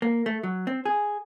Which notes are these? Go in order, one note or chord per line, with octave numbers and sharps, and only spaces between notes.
A#3
A3
F#3
C4
G#4